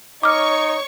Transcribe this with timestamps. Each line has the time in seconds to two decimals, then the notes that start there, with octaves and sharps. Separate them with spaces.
0.23 D#4 C#5 C#6 D6 F6